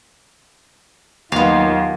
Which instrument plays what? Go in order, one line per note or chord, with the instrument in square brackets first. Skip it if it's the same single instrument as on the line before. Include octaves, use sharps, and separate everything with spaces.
[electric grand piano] D#2 [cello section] D#3 F#3 F4 [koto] B3 F5 [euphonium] D#4